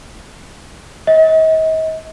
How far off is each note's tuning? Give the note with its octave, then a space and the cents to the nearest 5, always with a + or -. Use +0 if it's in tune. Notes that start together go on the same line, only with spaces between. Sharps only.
D#5 +40